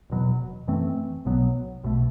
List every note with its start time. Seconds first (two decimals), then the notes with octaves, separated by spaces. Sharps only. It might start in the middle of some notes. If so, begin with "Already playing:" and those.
0.10 E1 E2 B2 F#3
0.67 F#2 E3 A3 C4
1.25 B1 B2 F#3 B3
1.83 B1 B2 A3